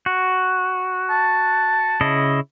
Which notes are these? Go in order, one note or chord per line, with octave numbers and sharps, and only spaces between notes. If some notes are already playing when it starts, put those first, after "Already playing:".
F#4
A5
C#3 E4 D#5